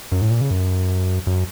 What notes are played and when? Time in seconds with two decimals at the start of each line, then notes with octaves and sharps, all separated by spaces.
0.12 F#2
0.22 A2
0.31 A#2
0.41 C#3
0.51 F#2
1.27 F#2